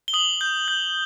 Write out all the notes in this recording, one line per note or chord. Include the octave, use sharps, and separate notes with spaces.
G7
D#6 F#7
G6
G6